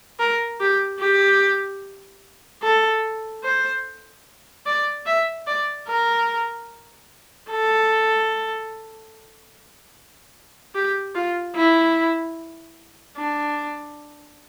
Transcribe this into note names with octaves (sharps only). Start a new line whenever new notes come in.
A#4
G4
G4
A4
C5
D5
E5
D5
A#4
A4
G4
F4
E4
D4